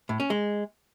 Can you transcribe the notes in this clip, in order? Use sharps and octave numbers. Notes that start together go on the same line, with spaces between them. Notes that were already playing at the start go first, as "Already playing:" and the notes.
A2
C#4
G#3